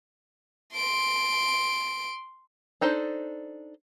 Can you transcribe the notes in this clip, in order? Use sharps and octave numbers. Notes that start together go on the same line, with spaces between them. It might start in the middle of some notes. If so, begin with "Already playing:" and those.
C6 D7
D4 D#4 A4 C5